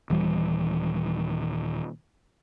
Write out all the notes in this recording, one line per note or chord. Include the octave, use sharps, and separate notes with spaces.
D#1 E3 G3